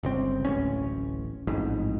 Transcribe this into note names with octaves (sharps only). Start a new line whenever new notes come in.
G1 C#2 C4
D1 A1 C#4
A1 F2 G#2